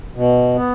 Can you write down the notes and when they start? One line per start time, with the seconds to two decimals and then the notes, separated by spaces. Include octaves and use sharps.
0.15 B2
0.56 B3